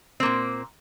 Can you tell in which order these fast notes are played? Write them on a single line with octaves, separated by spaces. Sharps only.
C4 A#3 A#2